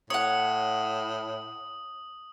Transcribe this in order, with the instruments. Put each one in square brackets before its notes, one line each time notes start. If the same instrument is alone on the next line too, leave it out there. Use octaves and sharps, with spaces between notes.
[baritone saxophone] A2 [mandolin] C#5 F#5 [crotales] D#6